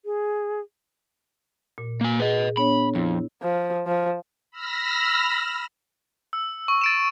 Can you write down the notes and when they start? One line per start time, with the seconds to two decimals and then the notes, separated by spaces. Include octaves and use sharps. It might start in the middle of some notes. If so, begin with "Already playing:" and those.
0.05 G#4
1.78 A#2
2.01 A#3 G#5
2.19 G#4 B4 D#5
2.57 B3 D4 C#5 B5
2.95 F2 E4
3.42 F3
3.87 F3
4.51 B5 E6 F6 A#6
6.33 E6
6.68 C#6
6.81 A6 D7 E7